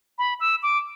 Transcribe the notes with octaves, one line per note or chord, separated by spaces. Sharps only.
B5
E6
D6